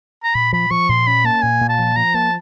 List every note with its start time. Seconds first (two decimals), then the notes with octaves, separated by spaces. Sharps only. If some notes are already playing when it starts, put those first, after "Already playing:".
0.24 A#5
0.35 A#2 B5
0.53 F3 B5
0.71 F3 C#6
0.89 A#2 C6
1.07 C#4 B5
1.24 A#3 A5
1.42 A#2 G#5
1.61 A#2
1.69 A5
1.79 F3
1.96 F3 A#5
2.14 A#3 A5